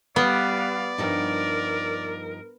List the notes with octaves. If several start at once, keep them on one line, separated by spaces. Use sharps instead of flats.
G3 B3 D5 F5
G2 F3 D#4 A#4